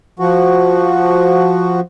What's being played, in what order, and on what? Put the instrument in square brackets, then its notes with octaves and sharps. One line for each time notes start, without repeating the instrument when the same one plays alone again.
[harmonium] F3 F#4